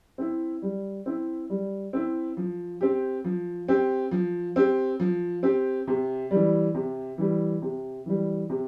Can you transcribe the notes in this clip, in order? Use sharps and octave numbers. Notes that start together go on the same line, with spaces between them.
C4 E4
G3
C4 E4
G3
C4 E4
F3
C4 G4
F3
C4 G4
F3
C4 G4
F3
C4 G4
C3
E3 G3
C3
E3 G3
C3
E3 G3
C3